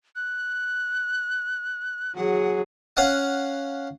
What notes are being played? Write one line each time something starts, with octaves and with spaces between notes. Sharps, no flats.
F#6
F#3 G#4 F#5
C#4 F5 F#5